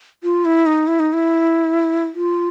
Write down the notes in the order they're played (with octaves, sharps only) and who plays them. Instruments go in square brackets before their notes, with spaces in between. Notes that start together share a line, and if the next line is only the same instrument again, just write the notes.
[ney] F4
E4
D#4
E4
D#4
E4
F4